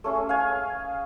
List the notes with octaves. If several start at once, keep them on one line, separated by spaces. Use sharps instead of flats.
A3 C#4 G#4
F5 G#5